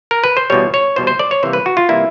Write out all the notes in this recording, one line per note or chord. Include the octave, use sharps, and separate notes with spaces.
A#4
B4
C5
E2 B2 G3 C#5
C#5
E2 B2 G3 C5
C5
D5
C#5
C3 E3 G3 A#3 C5
B4
F#4
F4
C3 E3 G3 A#3 E4